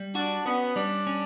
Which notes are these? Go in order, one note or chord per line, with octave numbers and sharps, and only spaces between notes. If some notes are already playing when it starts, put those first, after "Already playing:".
Already playing: G3
D4 F#4
B3 C#4
G3 D4
C#4